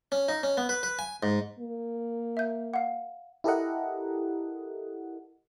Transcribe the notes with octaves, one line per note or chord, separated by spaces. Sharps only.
C#4
D#4
C#4
B3
B4
B4
G#5
G#2
A#3
E5 G6
F5 F#5
E4 G4 A4 A#4 D#5 F#5